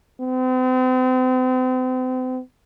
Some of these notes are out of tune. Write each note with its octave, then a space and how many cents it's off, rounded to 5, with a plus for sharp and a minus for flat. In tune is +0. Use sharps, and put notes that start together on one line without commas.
C4 -40